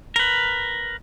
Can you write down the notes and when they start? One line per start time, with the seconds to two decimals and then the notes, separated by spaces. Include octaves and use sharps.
0.16 A#4 B4